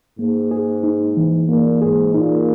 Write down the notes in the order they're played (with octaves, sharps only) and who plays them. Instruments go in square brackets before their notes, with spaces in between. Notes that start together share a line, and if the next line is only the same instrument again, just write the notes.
[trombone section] G#2 [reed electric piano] A#3
[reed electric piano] G#4
D#4
E3
[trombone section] A#2 [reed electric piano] A#3
[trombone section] G#2 [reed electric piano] G#4
[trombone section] A#2 [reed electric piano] D#4